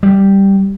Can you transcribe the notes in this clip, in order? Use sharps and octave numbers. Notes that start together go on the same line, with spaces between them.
G3